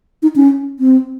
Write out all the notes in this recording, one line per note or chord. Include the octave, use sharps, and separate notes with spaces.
D#4
C#4
C4